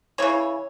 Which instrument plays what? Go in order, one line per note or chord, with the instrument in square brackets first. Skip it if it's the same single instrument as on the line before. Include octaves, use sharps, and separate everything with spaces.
[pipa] C#3 E3 A#3 C#5